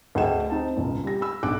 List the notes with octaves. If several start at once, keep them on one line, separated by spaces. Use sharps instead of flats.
D2 D4 G#4 D#5 G5 E7
C4 D#4 A5
E1 C#2
G3 A#6
B5 E6
B1 D4 D6 F#6 D7